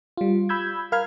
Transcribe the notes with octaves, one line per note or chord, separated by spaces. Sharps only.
G3 F4
B5 E6 G6 G#6
A#4 F5 B5 F6 G#6